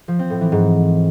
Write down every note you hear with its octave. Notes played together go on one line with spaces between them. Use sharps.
F3
C4
A2
E3
G#2